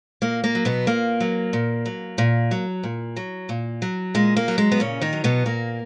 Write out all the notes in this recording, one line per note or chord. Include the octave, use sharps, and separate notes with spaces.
A#2 A#3
A#3
F#3
B2 B3
A#2 A#3
F#3
A#2
F#3
A#2
F#3
A#2
F#3
A#2
F#3
A#2 G#3
A#3
F#3
G#3
B3
A#2 C#3 C#4
D#3 D#4
F#3
B2 B3
A#2 A#3